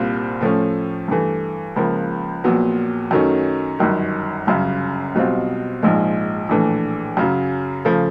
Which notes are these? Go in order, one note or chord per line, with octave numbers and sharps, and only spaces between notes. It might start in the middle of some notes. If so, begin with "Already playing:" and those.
Already playing: C2 A#2 G3 C4 F4
A2 F3 A3 C#4
G2 E3 A3
C#2 C#3 F3 A#3
A#1 A#2 F#3 B3
F#2 D#3 F#3 A3 C#4
G1 F#2 D#3
G1 F#2 C#3
B1 B2 G3 C4 F4
A#1 G#2 F3 G#3
A#1 A2 E3 A3 D4
F#2 C#3 F#3
C#3 F3 A3